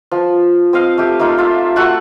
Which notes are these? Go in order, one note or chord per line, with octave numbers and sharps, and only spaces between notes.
F3
C4 D#5 F5
A3 G4
A3 A#3 D#4 F4
F4 E5
A3 F#4 F#5 C#6